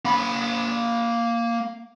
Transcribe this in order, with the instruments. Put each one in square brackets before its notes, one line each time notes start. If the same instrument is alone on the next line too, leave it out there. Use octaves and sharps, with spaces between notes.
[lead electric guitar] A#3 B5